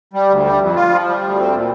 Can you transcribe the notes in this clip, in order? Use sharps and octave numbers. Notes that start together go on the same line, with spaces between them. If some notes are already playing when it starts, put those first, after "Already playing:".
G3
D2
G3
F2
F4
F3
G3
D2
C4
A#2